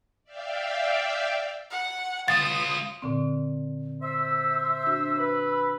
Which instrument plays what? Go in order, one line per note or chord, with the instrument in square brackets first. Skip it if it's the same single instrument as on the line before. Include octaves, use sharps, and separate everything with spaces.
[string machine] D5 E5 F5 G5
[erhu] F#5
[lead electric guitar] G#3 F5 [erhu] D#6 [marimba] A6
[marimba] A#2 D3 C4
[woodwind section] C5 E5 [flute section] E6
[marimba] D4 F#4
[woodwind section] B4 B5